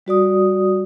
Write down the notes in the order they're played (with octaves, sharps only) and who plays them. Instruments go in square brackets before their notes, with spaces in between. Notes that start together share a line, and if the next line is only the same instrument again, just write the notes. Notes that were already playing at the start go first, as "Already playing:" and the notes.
[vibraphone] G3 F#4 D5 D#6